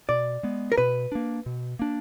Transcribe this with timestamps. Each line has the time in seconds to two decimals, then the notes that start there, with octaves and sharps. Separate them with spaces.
0.09 B2 D5
0.43 G#3 B3
0.72 A#4
0.77 B2 B4
1.12 A#3 D4
1.46 B2
1.79 A#3 D4